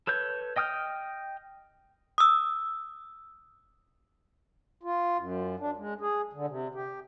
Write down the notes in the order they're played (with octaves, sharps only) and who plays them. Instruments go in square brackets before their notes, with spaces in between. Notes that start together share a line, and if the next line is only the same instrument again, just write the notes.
[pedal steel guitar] A4 B4 C#5 G6
D#5 G5 D#6 F6 G6
[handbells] D#6 E6
[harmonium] F4
F#2
D4
G#3
G#4
D3
C3
G4